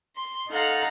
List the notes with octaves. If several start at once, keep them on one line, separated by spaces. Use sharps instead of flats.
C6
D#4 A4 F5 F#5 A#5